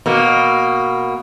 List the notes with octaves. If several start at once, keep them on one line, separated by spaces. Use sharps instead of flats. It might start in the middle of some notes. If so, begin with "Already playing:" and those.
B2 A#3